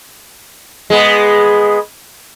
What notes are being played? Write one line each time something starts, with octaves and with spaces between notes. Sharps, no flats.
G#3 B3